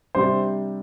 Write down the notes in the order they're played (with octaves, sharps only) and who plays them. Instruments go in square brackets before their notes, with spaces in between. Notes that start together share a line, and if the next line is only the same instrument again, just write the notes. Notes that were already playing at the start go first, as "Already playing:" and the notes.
[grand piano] C3 G3 D4 C5